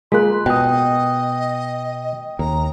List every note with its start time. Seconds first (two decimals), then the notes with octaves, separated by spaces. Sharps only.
0.12 G#3 A#3 F4 C6 F#6
0.46 B2 D#5 G5 D#6
2.39 D#2 A#5